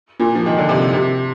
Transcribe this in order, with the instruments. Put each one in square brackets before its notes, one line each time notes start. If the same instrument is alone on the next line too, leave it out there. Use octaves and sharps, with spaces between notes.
[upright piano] A#2
F3
D#3
D3
C3
C3